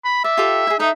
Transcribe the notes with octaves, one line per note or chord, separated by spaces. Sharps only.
B5
D5 E5
F4 G4 A4
E4 G#4
D#4 A4 E5